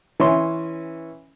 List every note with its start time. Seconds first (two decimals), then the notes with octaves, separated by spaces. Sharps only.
0.20 E3 C#4 C6